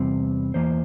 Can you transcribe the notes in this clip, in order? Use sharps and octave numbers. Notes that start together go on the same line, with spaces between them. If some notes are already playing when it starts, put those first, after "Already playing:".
Already playing: E2 C3 G3 C4
E2 E3 A#3 C5